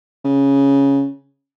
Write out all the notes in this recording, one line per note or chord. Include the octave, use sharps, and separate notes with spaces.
C#3